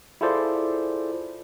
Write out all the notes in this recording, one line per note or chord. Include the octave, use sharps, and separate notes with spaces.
E4 F4 G#4 A4 C5 D5